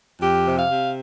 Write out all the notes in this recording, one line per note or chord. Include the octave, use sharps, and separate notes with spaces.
F2 G4
C3
F5
C3